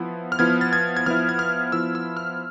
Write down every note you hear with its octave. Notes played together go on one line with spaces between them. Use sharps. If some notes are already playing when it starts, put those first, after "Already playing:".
Already playing: F3 B3 E4
F6
F3 B3 E4 G#6
A6
G#6
G#6
F3 B3 E4 F6
G#6
F6
F3 B3 E4 E6
E6
F6